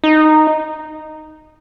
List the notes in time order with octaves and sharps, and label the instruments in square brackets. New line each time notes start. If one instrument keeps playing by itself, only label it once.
[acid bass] D#4